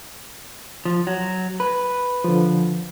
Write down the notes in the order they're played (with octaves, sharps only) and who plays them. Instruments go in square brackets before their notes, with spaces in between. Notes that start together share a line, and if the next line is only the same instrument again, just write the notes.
[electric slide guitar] F3
F#3
B4
[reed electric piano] D3 F3